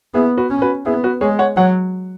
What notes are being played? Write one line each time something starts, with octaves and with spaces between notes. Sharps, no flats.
B3 E4 G#4
F#4 B4
C#4
F#4 B4
B3 E4 G#4
F#4 B4
G#3 G#4 C#5
C#5 F#5
F#3 C#5 F#5